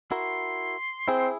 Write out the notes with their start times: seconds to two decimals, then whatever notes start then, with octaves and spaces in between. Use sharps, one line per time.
0.11 E4 F#4 A#4 C6
1.08 C4 E4 G#4